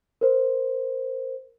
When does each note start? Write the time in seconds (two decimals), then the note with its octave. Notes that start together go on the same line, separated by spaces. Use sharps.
0.21 A#4 C5